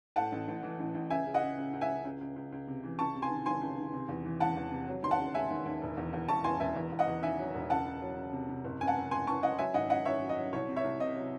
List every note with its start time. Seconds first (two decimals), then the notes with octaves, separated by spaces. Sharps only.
0.16 A2 F#5 A5
0.32 A1
0.48 A1
0.63 E3
0.79 A1
0.95 A1
1.10 C#2 E5 G#5
1.26 C#3
1.34 D#5 F#5
1.42 C#3
1.58 C#2
1.73 C#2
1.81 E5 G#5
1.89 C#2
2.05 C#2
2.21 C#2
2.36 C#2
2.52 C#2
2.67 C3
2.83 E3
2.99 C#2 A5 C#6
3.15 C3
3.22 G#5 C6
3.30 D#3
3.46 D#3 G#5 C6
3.61 C#2
3.78 D#3
3.93 C3
4.09 E2
4.25 E3
4.40 E2 F#5 A5
4.56 E2
4.71 C3
4.88 F#3
5.03 D#2 C6
5.11 F#5 A5
5.19 C#3
5.34 C#3 E5 G#5
5.50 D#2
5.66 D#2
5.82 E1
5.97 E2
6.13 E2
6.29 E2 A5 C#6
6.44 E2 G#5 C6
6.60 E1 E5 G#5
6.76 E2
6.92 E2
6.99 D#5 F#5
7.07 E2
7.23 D#3 E5 G#5
7.39 F#3
7.54 E1
7.70 C#2 F#5 A5
7.86 C#2
8.02 F#3
8.17 C#2
8.33 C3
8.49 C3
8.64 F#1
8.80 F#2 G#5
8.87 F#5 A5
8.96 F#2
9.11 F#1 G#5 C6
9.27 F#2 A5 C#6
9.43 F#2 D#5 F#5
9.58 F#3 E5 G#5
9.74 G#1 D#5 F#5
9.90 F#3 D#5 F#5
10.05 F#2 C#5 E5
10.21 F#3
10.29 D#5
10.37 F#3
10.53 C2 C#5
10.69 C3
10.76 C#5 E5
10.84 C2
11.00 C3 D#5
11.16 F#3